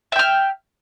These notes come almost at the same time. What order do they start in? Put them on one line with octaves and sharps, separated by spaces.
E5 G5 F6